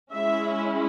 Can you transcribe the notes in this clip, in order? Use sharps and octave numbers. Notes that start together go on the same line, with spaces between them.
G#3 C#4 E4 E5